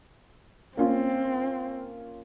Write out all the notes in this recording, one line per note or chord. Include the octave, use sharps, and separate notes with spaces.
A#3 C4 C#4 F4